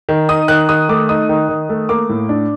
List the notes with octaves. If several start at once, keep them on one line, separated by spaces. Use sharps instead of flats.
D#3
D#4 D#6
D#3 F#6
D#3 D#6
A3 D6
D#4 D#6
D#3
D#3
A3
A#3 D6
A2
D4